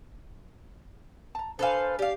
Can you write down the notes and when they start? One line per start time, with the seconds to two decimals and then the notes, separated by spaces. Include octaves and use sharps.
1.35 A5 A#5
1.59 D4 A4 B4 C5 F5 G#5
1.99 G4 D5 F5